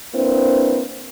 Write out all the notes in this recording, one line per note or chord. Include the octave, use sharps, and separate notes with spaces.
A#3 C4 D4 E4 B4 C5